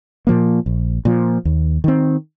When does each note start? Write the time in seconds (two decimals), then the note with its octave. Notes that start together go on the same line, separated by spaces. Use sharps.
0.27 A#2 F3 A#3
0.66 A#1
1.05 A#2 F3
1.45 D#2
1.84 D#3 C4